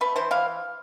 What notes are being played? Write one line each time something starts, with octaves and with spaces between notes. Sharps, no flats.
A3 B4
E3 C5
E3 F5